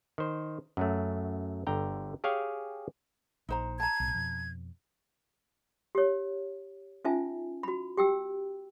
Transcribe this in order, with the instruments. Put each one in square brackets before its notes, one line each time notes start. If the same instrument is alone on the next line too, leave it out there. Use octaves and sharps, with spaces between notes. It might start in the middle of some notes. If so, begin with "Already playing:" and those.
[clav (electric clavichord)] D#3 C5
F#2 F#3 A3
G1 D3 G5 A#5
G4 G#4 C#5 F5 G5 G#5
[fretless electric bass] A#1 [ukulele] D#4 C5 A#5
[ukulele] A5 A#5 [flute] G#6
[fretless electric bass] B1 A2
F2 B2 F3
[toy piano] G4 C#5
C#4 D#4 F4 E5 G#5
F#4 B5
G4 G5 E6